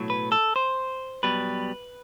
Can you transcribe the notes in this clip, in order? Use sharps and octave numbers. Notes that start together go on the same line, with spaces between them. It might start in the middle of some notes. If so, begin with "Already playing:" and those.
Already playing: B1 A2 F#3
B4
A4
C5
B1 B2 G3 B4